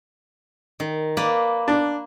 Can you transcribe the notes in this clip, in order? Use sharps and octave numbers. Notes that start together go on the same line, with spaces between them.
D#3
A#3 B4 D5
D4